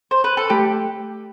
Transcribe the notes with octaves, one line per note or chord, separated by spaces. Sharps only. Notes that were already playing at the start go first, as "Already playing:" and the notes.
C5
B4
A4
A3 G4